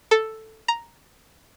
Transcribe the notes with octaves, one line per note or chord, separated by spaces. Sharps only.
A4
A#5